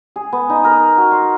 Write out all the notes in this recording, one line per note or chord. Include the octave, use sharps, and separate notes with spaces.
G#4
B3
D#4
A#4
F#4
C6